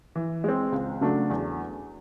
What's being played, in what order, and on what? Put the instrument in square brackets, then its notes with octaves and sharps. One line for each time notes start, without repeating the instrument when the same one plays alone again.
[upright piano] E3
G#3 C4
C#2
C#3 F#3 A3 D4
E2